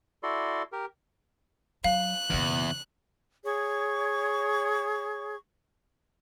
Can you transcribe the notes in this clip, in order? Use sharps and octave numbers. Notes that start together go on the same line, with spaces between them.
E4 F#4 A4 D5 C6
G4 A#4
F#3 F5 F#6
F#1 E2 B2
G#4 C#5 C#6